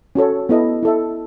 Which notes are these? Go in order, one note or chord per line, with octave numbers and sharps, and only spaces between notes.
C#4 F#4 A4 C#5
B3 E4 A4 D#5
E4 A4 E5